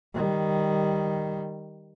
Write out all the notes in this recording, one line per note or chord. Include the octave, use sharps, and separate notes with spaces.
D#3 G3